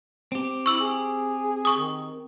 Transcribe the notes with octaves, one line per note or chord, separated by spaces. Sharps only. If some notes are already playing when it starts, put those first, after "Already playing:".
C4 G4
E4 C#6 E6 F#7
G#4
C#6 D#6
D#3